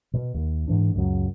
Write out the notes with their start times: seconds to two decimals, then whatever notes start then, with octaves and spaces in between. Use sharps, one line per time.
0.13 B2
0.34 D#2
0.68 G#2 E3 D4
0.95 C#2 F#2 C#3 F#3